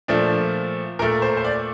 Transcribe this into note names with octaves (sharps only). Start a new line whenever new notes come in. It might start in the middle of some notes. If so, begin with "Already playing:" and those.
A#2 F3 A3 D4
A#2 A3 A#4
C5
C5
D5